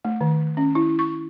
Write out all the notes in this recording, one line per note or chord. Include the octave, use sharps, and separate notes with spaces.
A3
D#3
C#4
E4
C#6